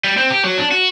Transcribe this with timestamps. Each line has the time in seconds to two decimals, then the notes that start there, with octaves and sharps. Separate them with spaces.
0.04 G3
0.17 C4
0.30 G4
0.44 F#3
0.58 D4
0.71 F#4